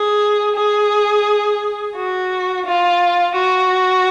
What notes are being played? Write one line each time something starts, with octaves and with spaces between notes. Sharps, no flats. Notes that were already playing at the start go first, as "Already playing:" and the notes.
Already playing: G#4
G#4
F#4
F4
F#4